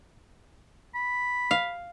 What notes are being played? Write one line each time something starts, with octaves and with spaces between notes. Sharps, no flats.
B5
F5